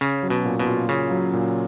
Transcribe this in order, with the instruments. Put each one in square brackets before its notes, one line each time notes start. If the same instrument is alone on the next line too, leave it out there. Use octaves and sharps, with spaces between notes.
[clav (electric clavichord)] C#3 [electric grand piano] C#4
[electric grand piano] F#3
[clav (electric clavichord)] B2
[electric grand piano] A#2
[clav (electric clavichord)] B2
[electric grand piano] F4
[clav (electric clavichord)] C#3 [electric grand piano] C#4
[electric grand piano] F#3
A#2